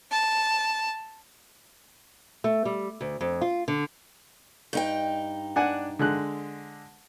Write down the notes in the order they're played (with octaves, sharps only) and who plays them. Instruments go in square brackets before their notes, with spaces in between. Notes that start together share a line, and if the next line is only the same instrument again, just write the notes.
[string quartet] A5
[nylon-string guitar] A3
G3
D2
F2
F4
D3
[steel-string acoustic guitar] G2 D#4 G5
[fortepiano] D4 F#5 G#5
D3 G#3 F#6